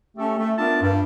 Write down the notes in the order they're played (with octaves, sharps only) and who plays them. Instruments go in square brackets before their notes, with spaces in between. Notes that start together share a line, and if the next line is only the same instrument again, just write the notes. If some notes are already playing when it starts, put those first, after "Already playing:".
[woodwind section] A3 C#4 G4 A4
A3
B3 D4 F4 A#4 E5 A5
G2